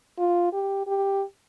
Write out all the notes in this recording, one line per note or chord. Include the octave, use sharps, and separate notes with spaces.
F4
G4
G4